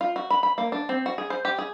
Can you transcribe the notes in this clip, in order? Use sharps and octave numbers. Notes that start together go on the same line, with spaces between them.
F4
F#4
B5
B5
A#3
D4
C4
F#4
G#4
C5
G4
G#4